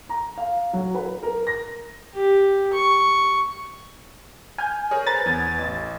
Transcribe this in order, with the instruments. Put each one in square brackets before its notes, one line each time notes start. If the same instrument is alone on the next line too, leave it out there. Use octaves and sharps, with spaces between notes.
[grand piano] A#5
F5
F#3
B4
A#4
A#6
[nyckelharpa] G4
C#6
[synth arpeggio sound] G#5 [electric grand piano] F6 G6
[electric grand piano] G#4 A#4 C#5
[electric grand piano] B4 C5 A#5 [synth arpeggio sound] A6
[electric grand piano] E2 B3 G#6
A1